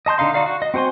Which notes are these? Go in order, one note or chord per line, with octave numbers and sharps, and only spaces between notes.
D#5 A5 C6 G6
D3 D4 D#4 F5 C6
D#4 F#4 D5 F5
F#4
D#5
C4 F#4 C5 G#5 C6